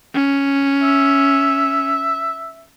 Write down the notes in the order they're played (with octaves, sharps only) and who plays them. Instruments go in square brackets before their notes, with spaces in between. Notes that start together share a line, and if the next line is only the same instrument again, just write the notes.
[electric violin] C#4
[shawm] E5